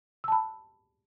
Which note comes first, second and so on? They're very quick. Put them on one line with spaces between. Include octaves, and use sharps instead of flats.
E6 A5 B5